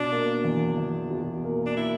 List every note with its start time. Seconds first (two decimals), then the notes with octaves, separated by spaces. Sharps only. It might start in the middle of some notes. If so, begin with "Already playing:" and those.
Already playing: B2 D4
0.12 A#3
0.44 E2
0.78 E2
1.11 B2
1.44 A#3
1.66 D4
1.77 E4